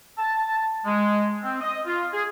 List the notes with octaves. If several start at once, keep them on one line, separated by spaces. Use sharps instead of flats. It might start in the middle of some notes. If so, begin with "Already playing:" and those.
A5
G#3
C4
D#5
F4
G#4